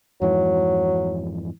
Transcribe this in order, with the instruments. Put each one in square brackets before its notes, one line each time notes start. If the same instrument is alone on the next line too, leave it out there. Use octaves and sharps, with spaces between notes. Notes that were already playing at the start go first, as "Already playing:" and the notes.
[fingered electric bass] F2 G#2 E3 [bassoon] F#3